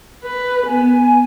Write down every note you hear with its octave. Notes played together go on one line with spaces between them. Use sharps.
B4
B3 G#5